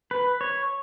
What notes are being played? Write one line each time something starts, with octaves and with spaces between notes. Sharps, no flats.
B4
C#5